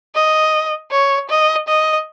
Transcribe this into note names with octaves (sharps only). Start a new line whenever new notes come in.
D#5
C#5
D#5
D#5